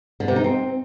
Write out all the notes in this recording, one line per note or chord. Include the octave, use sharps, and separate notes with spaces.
D3
C3
D#4
C4